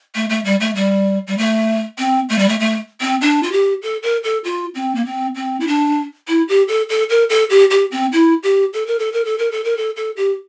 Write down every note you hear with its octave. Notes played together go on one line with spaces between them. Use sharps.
A3
A3
G3
A3
G3
G3
A3
C4
A3
G3
A3
A3
C4
D4
F4
G4
A4
A#4
A4
F4
C4
A#3
C4
C4
E4
D4
E4
G4
A4
A4
A#4
A4
G4
G4
C4
E4
G4
A4
A#4
A4
A#4
A4
A#4
A4
A#4
A4
A4
G4